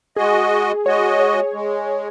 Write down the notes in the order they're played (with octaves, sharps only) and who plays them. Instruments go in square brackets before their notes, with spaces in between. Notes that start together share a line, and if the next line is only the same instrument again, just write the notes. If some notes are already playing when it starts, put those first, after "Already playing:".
[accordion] G#3 F#4 D#5 [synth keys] G#4
[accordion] G#3 F#4 D#5 [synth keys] C#5
[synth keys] C#5
[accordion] G#3